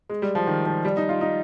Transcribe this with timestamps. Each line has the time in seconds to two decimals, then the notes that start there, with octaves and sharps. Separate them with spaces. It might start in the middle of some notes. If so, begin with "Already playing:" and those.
0.10 G#3
0.22 G3
0.35 F3
0.47 D#3
0.66 F3
0.85 G3
0.97 D#4
1.09 F4
1.21 D#4